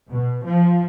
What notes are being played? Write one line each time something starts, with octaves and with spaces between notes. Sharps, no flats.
B2
F3